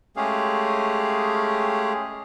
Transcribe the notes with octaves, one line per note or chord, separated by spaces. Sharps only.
G#3 A3 C#4 G4 G#4 F5